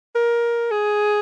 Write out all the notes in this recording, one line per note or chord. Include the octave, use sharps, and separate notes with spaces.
A#4
G#4